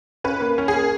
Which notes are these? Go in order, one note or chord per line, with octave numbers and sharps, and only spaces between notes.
C#4 B4
A#3
C#4
G#4
A#3